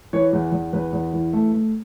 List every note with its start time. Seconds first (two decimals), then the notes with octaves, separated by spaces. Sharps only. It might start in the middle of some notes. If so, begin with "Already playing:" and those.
0.13 E3 C#5
0.33 E2
0.52 E2
0.73 E2 B4
0.93 E2
1.13 E3
1.33 A3
1.53 A3